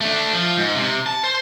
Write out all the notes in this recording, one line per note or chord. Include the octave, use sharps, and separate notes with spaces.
A3 D4
F3
G#2
C3
A5
C5